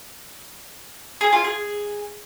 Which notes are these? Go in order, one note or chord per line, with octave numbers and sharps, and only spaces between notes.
G#4
F4
G#4